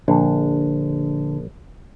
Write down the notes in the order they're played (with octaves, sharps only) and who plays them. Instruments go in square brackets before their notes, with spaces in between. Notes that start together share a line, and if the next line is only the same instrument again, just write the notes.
[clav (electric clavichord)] A#1 [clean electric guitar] D3